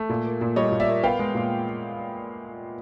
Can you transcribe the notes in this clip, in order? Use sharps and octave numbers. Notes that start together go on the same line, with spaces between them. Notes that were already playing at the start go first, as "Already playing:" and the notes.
Already playing: A3
A#2
A#3
A#2
G3 C#5 D#5
A#2
D5 E5
A#3
B3 F5 G5
G#3
A#2